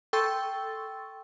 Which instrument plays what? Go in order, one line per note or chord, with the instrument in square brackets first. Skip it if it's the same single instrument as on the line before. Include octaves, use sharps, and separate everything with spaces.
[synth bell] A4 G5 C6 C#6 E6 A6